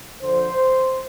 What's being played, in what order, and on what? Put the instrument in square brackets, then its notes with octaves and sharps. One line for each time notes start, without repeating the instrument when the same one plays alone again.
[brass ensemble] D3 F3 C5